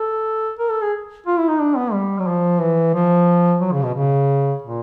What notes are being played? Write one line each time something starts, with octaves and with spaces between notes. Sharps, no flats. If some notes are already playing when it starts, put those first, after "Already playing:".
Already playing: A4
A#4
A4
G#4
F4
E4
D#4
D4
B3
G3
F#3
F3
E3
F3
F#3
C#3
B2
C#3
A#2